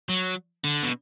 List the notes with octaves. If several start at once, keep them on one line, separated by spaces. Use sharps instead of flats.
F#3
D3
B2